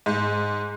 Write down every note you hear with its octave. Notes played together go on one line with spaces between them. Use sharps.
G#2